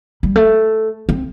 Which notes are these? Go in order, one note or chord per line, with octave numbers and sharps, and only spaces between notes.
G3
A3
C4